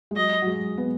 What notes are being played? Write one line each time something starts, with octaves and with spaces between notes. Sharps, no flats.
G#3
F#3 D#5
F#3
G#3
B3